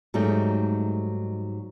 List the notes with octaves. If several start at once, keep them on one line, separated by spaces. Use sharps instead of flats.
G#2 F#3 G3 A3 D#4 G#4